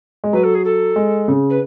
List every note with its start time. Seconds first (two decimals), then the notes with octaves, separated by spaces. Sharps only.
0.24 G#3
0.32 F#3 B4
0.43 A4
0.54 G#4
0.64 A4
0.96 G#3
1.28 C#3
1.49 B4